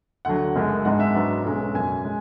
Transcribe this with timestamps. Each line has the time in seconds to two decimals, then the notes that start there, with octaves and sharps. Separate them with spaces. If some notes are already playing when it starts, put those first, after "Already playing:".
0.25 D2 D3 F#3 F#5
0.55 F#1 F#2 C#3 G#3
0.85 G#1 G#2 G#3 D4 F#5
1.00 E5
1.14 G#2 F#3 B3 D4
1.45 B1 B2 G#3 C#4
1.75 F#2 C#3 F#3 C#4 G#5
2.05 G#3